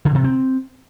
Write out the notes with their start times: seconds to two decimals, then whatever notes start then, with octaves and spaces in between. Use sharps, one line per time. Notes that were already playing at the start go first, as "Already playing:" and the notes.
0.05 D3
0.15 C3
0.24 C4